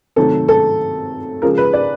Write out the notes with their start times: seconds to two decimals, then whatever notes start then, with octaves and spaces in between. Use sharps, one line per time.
0.16 C3 D#3 F#3 A3 A4
0.48 A4
1.42 C#3 F3 G#3 A#4
1.58 B4
1.73 D5